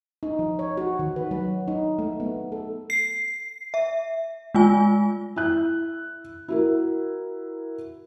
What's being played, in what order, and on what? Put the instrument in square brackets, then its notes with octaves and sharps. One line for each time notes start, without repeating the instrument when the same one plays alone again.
[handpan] D#4
F3
C#5
F#4
D#3
B4
F#3
D#4
A3
B3
A4
[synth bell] C7
E5
G#3 F4 G#5
[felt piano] E4 F#6
E4 F#4 A#4